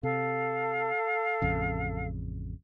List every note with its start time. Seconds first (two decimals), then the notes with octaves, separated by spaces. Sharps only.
0.03 C3 A4 F5
1.42 A1 F2 C#3